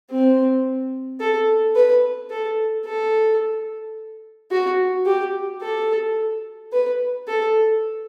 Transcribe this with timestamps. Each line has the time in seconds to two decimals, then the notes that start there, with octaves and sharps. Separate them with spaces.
0.11 C4
1.20 A4
1.75 B4
2.30 A4
2.85 A4
4.52 F#4
5.06 G4
5.61 A4
6.72 B4
7.27 A4